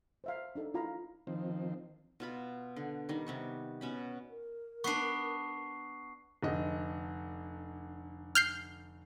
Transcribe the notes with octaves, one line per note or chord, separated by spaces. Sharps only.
C5 E5 F5
D4 D#4 A4
E4 F4 F5 A#5 B5
D#3 F3 C4
B2 F4 B5
D3
D#3 G3
C3 B3 C#6
B2 C#4 B5
A#4
B3 D4 C#6 C7
F1 D3 D#5
F6 G6 C7